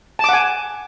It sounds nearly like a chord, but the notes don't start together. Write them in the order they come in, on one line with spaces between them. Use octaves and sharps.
A5 D6 F#5 G#5